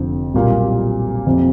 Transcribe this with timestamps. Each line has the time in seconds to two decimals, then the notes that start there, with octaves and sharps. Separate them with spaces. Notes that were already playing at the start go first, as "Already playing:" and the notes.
Already playing: F1 F2 D3
0.34 B1 A#2 G3 A#3
1.27 F2 C3